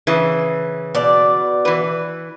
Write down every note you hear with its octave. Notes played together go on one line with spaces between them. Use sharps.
C#3 E3
B2 D5
E3 B4